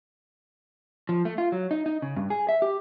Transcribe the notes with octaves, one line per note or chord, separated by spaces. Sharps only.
F3
A3
F4
F#3
D#4
D#4
C#3
G2
G#4
E5
G4